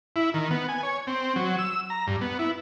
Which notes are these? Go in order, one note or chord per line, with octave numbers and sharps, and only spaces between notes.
E4
D#3
B3
G#5
C#5
C4
F#3
E6
A#5
G2
B3
E4